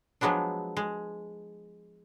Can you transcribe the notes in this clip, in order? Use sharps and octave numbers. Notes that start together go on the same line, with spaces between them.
F3 F#3 G#3 B3 D4
G#3